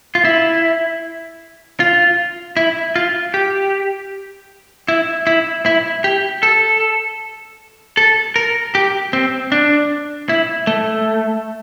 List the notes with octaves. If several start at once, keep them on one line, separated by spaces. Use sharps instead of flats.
F4
E4
F4
E4
F4
G4
E4
E4
E4
G4
A4
A4
A#4
G4
C4
D4
E4
A3